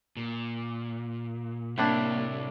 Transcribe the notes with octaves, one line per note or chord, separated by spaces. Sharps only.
A#2
A2 C3 A#3 D4 E4